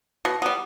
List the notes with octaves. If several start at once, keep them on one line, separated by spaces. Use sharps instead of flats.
B2
G3 B3